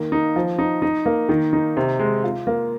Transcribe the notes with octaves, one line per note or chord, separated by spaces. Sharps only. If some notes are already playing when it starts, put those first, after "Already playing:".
Already playing: D#3 A#3
D#4
F3
D#4
D#4
A#3
D#3
D#4
C3
G#3
F4
A#3